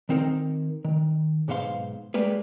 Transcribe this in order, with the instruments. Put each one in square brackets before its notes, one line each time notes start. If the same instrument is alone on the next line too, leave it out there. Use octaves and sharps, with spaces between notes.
[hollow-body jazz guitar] D#3 C4 D#4 A#4
D#3
B1 G#2 B3 C5 F5 C6
G3 G#3 A#3 B4